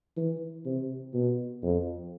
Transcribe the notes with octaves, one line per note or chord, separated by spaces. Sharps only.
E3
C3
B2
F2